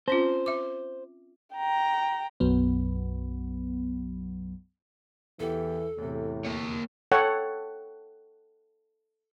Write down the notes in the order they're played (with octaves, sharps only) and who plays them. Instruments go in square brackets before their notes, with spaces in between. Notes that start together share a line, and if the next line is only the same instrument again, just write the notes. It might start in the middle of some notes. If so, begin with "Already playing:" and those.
[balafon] C4 C#4 F4 [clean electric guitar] C5
[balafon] E5 D6
[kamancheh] G5 A#5
[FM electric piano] B1 F#2 F#3 B3
[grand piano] E2 G4 [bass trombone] E3 [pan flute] A4
[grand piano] E2 C3 [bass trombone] A2
[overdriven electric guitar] A#3 C#5
[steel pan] A4 C#5 F#5 G5